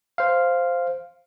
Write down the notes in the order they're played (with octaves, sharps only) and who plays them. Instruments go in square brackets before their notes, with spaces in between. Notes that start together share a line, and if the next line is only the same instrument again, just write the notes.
[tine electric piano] C5 F5